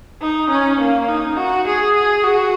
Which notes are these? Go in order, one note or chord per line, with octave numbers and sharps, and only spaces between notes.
D#4
C#4
A#3
D#4
F#4
G#4
G#4
F#4